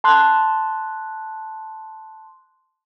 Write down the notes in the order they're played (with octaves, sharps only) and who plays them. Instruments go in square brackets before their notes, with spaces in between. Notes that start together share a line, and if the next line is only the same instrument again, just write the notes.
[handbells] A5 C6 F#6